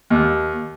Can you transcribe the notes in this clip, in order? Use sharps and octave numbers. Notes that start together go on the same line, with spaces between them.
D#2